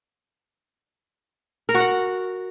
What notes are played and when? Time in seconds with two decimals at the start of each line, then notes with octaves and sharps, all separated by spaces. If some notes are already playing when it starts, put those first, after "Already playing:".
1.69 A#4
1.75 F#4
1.80 F#5